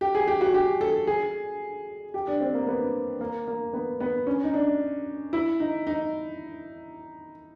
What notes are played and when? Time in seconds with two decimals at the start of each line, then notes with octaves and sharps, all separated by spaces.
0.01 G4
0.15 G#4
0.28 G4
0.41 F#4
0.54 G4
0.81 A4
1.07 G#4
2.14 G4
2.27 D4
2.40 C4
2.54 A#3
2.67 B3
3.21 A#3
3.47 A#3
3.73 B3
4.00 B3
4.27 C#4
4.44 D#4
4.54 D4
5.33 E4
5.60 D#4
5.87 D#4